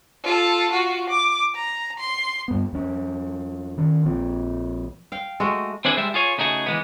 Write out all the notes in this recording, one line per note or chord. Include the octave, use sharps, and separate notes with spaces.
F4 A4
F4 F#4
D6
A#5
C6
G2 B3
F2 C#4
D#3 C#4
A#1 F3 C4
F5 G5
G#3 A3 F#4 D#5
C4 D4 E4 G#4 A4 B4
G3 G#3 E5
F4 G#4 C#5
C#3 A3 D#4 F#4 G#4
E3 G#3 B3